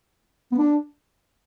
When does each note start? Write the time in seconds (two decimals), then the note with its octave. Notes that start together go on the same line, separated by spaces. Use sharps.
0.52 B3
0.58 D4